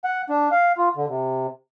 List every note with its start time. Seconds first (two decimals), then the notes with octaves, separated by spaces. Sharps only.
0.04 F#5
0.30 D4
0.52 F5
0.78 F4
0.96 D3
1.08 C3